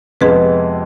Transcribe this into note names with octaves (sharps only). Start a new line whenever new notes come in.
F2 C3 G#3 B3 G#4 B4